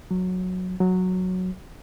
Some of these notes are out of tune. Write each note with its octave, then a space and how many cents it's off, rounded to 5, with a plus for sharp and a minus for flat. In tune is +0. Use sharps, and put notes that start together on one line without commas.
F#3 -10
F#3 -5